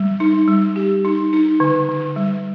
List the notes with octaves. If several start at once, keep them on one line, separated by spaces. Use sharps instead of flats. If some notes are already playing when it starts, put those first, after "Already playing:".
Already playing: G3
D#4
G3
G4
D#4
D#4
D3
D3
G3